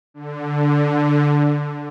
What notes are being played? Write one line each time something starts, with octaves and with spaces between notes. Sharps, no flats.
D3